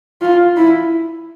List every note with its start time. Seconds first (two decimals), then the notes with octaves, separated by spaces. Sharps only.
0.21 F4
0.57 E4